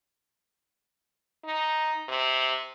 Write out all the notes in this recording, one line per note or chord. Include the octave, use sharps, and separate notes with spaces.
D#4
C3